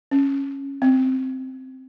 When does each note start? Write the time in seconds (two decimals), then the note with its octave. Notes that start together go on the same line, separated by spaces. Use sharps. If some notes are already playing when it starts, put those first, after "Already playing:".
0.11 C#4
0.82 C4